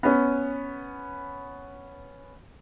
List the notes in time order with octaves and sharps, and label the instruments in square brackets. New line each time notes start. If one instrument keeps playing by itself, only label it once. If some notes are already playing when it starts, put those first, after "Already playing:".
[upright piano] B3 C#4